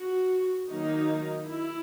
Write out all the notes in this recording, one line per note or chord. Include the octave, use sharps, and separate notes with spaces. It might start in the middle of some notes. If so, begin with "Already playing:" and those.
Already playing: F#4
D#3 F#3 A#3 D#4
E4